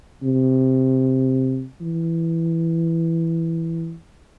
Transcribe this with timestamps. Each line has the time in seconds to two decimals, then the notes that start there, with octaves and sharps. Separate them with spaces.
0.23 C3
1.81 E3